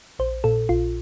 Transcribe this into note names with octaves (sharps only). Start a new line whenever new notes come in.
A#1 C5
A#2 A4
A#1 F4